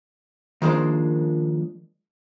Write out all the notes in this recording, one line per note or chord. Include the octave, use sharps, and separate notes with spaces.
D#3 F3 G#3 A#3 D4 C5